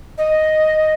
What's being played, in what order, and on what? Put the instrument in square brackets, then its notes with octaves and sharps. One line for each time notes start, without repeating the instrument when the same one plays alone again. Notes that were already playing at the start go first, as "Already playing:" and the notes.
[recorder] D#5